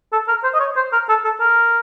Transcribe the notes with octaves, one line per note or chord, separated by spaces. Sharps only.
A4
A#4
C5
D#5
C#5
C5
A#4
A4
A4
A#4